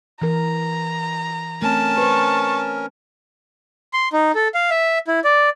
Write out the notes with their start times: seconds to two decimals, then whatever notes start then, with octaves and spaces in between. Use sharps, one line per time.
0.22 E3 A#4 A#5
1.62 A3 C4 C#4 A#4 A5
1.98 B4 C5 C#6
3.93 C6
4.13 D#4
4.35 A4
4.54 F5
4.71 E5
5.08 E4
5.24 D5